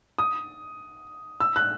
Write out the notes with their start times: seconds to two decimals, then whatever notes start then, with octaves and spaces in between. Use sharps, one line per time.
0.18 D#6
1.40 E6
1.56 F#6